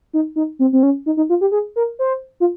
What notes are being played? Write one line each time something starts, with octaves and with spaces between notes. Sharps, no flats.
D#4
D#4
C4
C4
C#4
D#4
D#4
F4
G4
G#4
A#4
C5
F4